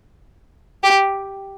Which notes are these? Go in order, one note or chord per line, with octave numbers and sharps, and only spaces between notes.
G4